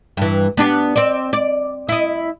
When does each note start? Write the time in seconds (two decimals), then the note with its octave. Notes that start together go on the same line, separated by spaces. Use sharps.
0.17 G2 E3
0.57 B3 D4 G4
0.96 C4 D5
1.33 D5
1.89 E4 D#5